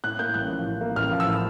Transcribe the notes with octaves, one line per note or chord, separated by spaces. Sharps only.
A2 F#6
A#3 G6
A1 F#6
F3
A2
A#3
A1 F6
F3
E6
A2